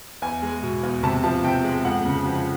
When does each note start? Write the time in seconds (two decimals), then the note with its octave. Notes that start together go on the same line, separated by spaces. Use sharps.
0.22 E2 G#5
0.42 G#3
0.63 B2
0.83 E2
1.03 C3 A5
1.24 F3 A5
1.44 C3 G5
1.64 G#3
1.85 F2 F#5
2.05 C#3
2.26 F3